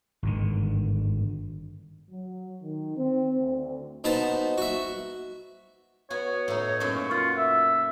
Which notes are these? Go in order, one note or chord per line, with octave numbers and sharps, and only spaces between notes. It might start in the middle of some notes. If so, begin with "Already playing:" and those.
G#1 G2 D3
F#3
D#3
C4
D2
B2 D#4 B4 C5 A5
F#4 E5
B3 F#4 C#5
A2 D#4
F#2 A#2 C#6
F4 F#5
E5